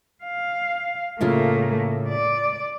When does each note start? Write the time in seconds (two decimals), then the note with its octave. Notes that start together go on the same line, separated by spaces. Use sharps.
0.24 F5
1.21 A2 C#3 A3 A#3 F4
2.09 D5